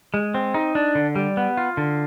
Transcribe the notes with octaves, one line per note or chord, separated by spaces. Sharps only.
G#3
C4
D#4
D4
D3
G3
B3
F4
D3